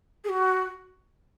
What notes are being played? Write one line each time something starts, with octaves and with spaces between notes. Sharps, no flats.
G#4
F#4